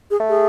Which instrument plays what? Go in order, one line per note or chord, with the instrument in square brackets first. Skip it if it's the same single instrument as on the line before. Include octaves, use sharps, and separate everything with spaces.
[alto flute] G#4
[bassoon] A3
[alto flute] G#4